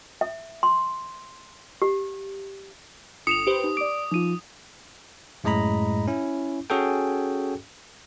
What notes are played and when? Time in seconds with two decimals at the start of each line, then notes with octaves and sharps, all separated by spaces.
0.21 E5
0.63 C6
1.82 G4
3.27 G1 D#6 C#7 E7 F7
3.47 G4 B4 C5
3.64 D#4
3.77 D5 D6 D7
4.11 F3 D#4 F4 D#7
5.44 F#2 A2 G#3 D#5 A#5 B5
6.08 C#4 E4
6.70 C#4 F#4 G#4 A4 G5